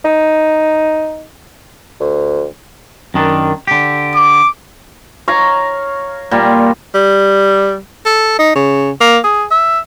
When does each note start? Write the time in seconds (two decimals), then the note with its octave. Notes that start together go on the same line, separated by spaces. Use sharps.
0.05 D#4
2.00 D2
3.14 F#2 D#3 D4
3.67 D3 G4
4.15 D6
5.28 C#5 F5 A#5
6.31 A#2 G3
6.94 G3
8.06 A4
8.39 D#4
8.55 C#3
9.01 A#3
9.24 G#4
9.51 E5